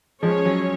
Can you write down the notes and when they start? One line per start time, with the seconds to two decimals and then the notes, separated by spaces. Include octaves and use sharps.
0.23 F3 G#3 C#4 G#4 C#5
0.46 F#3